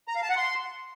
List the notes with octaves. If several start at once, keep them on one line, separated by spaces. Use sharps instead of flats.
A#5
F5
A5
F#5
C6